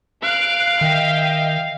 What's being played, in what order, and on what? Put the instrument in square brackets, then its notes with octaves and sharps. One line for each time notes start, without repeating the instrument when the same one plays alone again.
[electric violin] F5 [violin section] F#6 D7
[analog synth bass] D#3 [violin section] D#5 E5 G5